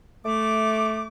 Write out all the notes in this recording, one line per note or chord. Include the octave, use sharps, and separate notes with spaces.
A3 D6